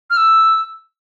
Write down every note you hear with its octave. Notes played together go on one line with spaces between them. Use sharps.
F6
E6